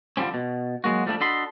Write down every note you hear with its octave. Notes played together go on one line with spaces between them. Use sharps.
D3 F3 G3 C4 C#4
B2
F#3 G#3 A#3 F#4
F3 G3 A3 A#3 D4
D4 F#4 A4 D#5 B5 C6